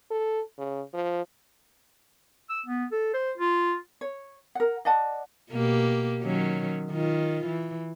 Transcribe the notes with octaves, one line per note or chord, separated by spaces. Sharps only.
A4
C#3
F3
E6
B3
A4
C5
F4
C#5
A#4 F#5
D5 D#5 F#5 A5
B2 A#3 G4
D#3 F#3 C#4
D#3 F4
E3